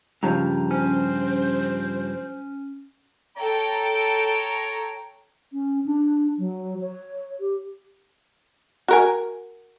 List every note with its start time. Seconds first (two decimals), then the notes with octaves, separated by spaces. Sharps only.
0.23 G2 C#3 F3 A#5
0.71 C#4 C5
3.38 A4 C#5 G5 A#5
5.53 C#4
5.86 D4
6.39 F#3
6.81 C#5
7.40 G4
8.88 F#4 A#4 G#5